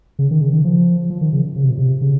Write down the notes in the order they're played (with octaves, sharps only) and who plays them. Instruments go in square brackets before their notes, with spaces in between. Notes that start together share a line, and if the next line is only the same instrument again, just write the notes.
[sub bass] C#3
D#3
C#3
D#3
F3
F3
D#3
C#3
C#3
C3
A#2
C3
C#3